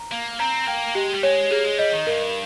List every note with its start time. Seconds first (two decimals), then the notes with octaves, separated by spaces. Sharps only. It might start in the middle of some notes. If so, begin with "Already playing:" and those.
Already playing: A#5
0.11 A#3 F5
0.39 C4 A#5
0.67 A#3 G5
0.95 G#3 G4
1.14 G3
1.23 G#3 C#5
1.51 A#3 G#4
1.65 G#3
1.78 G3 D#5
1.93 D#3
2.06 G2 A#4